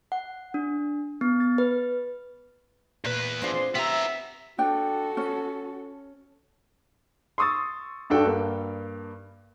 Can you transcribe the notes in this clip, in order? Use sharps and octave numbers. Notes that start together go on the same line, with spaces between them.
F#5
D4
B3
A6
B4
E2 A#2 B4
C4 D4 F4 G#4 D5 C6
B3 G4 E5 A#5
D4 F#4 A4 G5
C#4
C6 C#6 D#6 E6 A6
G2 D4 F#4 A4 G5
G2 A#3